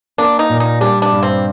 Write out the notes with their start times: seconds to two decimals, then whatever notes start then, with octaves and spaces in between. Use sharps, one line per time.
0.18 A#3 D4
0.39 D#4
0.49 A#2
0.60 D#4
0.81 G3 D4
1.02 D4
1.12 G2
1.23 C4